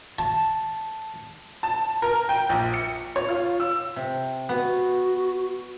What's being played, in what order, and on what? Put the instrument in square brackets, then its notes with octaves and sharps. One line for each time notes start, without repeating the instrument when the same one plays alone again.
[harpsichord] A5
[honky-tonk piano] A5
A#4
G5
A#1
C#7
C#5
F4
E6
[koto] C3
[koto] B3 [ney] F#4